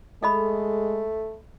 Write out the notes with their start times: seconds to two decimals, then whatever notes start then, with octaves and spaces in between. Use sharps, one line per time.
0.23 G#3 A3 A4 D#5 B5